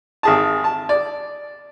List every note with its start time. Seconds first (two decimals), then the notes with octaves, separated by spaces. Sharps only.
0.23 G#1 G#4 A5
0.64 A5
0.89 D5